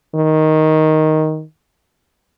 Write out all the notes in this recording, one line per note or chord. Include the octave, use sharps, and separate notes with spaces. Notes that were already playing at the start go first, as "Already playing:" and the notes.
D#3